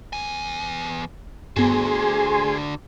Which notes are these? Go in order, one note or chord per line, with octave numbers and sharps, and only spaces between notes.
E2 G#5
G2 D3 B3 F#4 G#4 G#5 C6